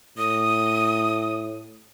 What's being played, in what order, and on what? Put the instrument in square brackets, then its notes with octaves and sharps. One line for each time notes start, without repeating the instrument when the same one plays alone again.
[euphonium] A2 [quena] D#6